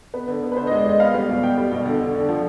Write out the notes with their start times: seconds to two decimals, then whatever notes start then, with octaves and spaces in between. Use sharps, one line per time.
0.14 B3 B4
0.28 D3
0.43 B3
0.52 B4
0.56 D3 C5
0.67 D#5
0.71 G#3
0.79 D5
0.86 G#3 D#5
1.00 B3 F5
1.14 G3
1.29 B2
1.43 B2 G5
1.58 G3
1.72 B2
1.86 D3
2.00 D3
2.15 D3
2.29 F3